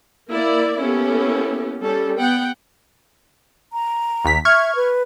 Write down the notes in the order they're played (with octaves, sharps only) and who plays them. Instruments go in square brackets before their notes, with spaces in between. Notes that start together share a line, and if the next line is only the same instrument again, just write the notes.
[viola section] A#3 E4 D5
A#3 B3 C#4 E4 G4 A4
G3 C#4 A4
B3 F#5 G5
[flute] A#5
[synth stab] D#2 B6
[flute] E5 [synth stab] C#6 F6 G#6
[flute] B4